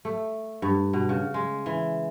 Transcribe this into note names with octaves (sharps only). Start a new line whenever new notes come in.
A3
G2
B2
C#3
G#3
E3